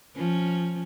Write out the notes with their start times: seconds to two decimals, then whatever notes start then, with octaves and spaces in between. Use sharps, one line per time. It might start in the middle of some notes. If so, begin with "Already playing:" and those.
0.16 F3 C#4